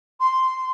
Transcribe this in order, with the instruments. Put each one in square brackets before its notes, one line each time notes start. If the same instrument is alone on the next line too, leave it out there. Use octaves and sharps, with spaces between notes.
[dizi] C6